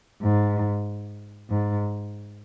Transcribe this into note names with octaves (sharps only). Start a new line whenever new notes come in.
G#2
G#2